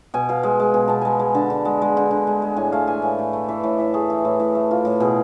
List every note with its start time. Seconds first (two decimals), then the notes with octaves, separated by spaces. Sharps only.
0.14 B2 G#5
0.29 B2 F5
0.43 G#3
0.60 G#3
0.74 B2 G#5
0.88 B2 A5
1.01 G#3 G#5
1.19 G#3
1.35 D3 A5
1.50 D3
1.65 G#3
1.82 G#3
1.97 D3
2.11 D3
2.27 G#3
2.42 G#3
2.57 A2 G#5
2.72 A3 F5
2.87 E3 G#5
3.02 A2 G#5
3.19 A2
3.33 A3
3.48 E3 E5
3.63 A2
3.79 A2 E5
3.94 A3 G#4
4.10 E3
4.25 A2
4.40 A2
4.55 A3
4.71 E3 F4
4.85 A2
5.00 B2 G#4